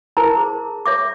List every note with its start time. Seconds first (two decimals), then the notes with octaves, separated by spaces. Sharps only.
0.17 E4 A4 A#4 C5 A5 A#5
0.37 G#4
0.86 C#5 E5 D6